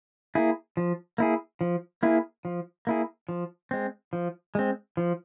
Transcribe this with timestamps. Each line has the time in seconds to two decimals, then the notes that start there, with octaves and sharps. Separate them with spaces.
0.35 A#3 E4 G#4
0.77 F3
1.18 A#3 E4 G#4
1.61 F3
2.03 A#3 E4 G#4
2.45 F3
2.87 A#3 E4 G#4
3.28 F3
3.71 G#3 C4
4.13 F3
4.55 G#3 C4
4.97 F3